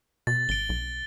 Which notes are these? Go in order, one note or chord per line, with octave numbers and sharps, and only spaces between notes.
B2 A6
G#1 D7 G7
B1